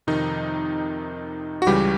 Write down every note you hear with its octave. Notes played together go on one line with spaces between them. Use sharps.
F2 C3 D#3 D#4
F#4
C#2 C#3 E3 G3 G4